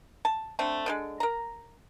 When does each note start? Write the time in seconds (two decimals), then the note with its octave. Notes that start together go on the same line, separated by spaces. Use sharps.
0.25 A5
0.59 D3 A3 C4
0.86 D3 F3 G#3
1.20 A#4 A#5